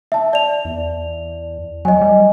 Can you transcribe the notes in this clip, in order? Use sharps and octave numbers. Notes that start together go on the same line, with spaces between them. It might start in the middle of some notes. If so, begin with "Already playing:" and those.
E5 A5
D5 F7
E2
F#3 D#5 G#5
G3